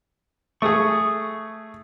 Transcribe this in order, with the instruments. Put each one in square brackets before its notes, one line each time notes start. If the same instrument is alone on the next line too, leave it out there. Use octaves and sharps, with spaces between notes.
[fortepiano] A3 G#4 [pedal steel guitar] C#6 D#6